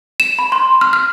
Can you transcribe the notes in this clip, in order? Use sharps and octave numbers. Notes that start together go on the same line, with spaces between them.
E7
B5
C6
F6
F6